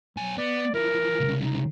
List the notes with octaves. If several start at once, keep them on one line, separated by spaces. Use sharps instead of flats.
B1 F#3 G#5
B3 D5
E3 F3 A#4
C2 C#3
D#4